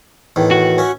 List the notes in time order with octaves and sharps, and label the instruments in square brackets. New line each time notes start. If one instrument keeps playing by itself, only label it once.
[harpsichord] E2 A2 D#3
[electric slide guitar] F#4
[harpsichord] C#4 E5